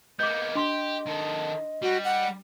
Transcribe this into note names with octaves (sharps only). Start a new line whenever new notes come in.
A#3 B3 D#5 D6 G6
D4 G4 C6
D#3 A4
G3 F#4
F#5